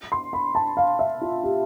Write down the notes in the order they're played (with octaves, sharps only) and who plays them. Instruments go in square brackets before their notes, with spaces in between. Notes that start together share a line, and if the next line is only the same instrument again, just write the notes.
[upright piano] C6
B5
A5
F5
E5
F4
G4